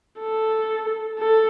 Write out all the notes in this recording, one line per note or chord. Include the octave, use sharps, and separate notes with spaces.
A4
A4